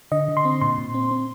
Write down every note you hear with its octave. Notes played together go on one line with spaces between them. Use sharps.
D3 D#5
D3
C6
C4
A#2 C6
A#2
C4
C4